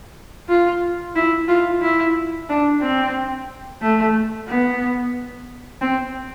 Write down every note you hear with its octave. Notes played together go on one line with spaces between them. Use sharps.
F4
E4
F4
E4
D4
C4
A3
B3
C4